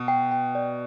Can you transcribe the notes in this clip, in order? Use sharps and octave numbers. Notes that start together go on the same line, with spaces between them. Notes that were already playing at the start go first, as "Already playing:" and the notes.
Already playing: B2
G5
G5
D5